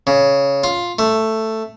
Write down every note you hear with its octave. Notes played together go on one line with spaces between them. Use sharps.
C#3
F4
A3